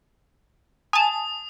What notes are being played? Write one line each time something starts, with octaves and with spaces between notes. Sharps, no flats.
G#5 A5 D#6